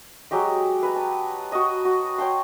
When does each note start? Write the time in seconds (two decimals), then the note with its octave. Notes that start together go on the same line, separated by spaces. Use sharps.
0.31 F#3 G#3 G4 D#5
0.83 B4 A#5
0.96 A5
1.52 F#4 D#5
1.85 F#4
2.18 C#5 G5 A5 C6